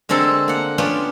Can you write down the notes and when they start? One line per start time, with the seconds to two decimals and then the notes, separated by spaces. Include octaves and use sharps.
0.09 D3 G#3 C4 A4 A#4
0.48 A#3 F#5
0.78 B3 C#4 D4 F4 G5